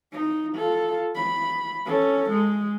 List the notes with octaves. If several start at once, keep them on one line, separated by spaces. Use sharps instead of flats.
D#4
F4 A4
B5
C#4 A4
G#3